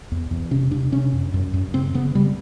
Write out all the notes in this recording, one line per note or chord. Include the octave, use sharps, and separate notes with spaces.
E2
E2
C3 C#4
C3 D4
C3 C#4
F#2
F#2
F#2
C#3 C4
C#3 B3
C#3 G3